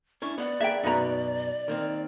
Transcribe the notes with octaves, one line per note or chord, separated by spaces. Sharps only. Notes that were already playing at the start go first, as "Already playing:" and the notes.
C#4 D4 E4 C#6
B3 D5 F#5
A#3 G#4 B4 E5 G5
F#2 B2 D#4 B4 A#5
D#3 A#3 C4